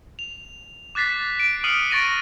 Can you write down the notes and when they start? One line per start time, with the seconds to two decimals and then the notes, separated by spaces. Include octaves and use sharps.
0.19 F7
0.95 D6 F#6 A6 B6 C7
1.39 D7
1.64 D#6 F6 C7 C#7 D#7 F#7
1.90 C#6 A6 A#6 D7 D#7